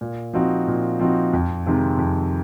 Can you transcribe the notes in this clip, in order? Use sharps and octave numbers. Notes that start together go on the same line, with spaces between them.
A#2
F3 C4 D#4 F#4
A#2
F3 C4 D#4 F#4
F2
C3 D#3 G#3 C4
F2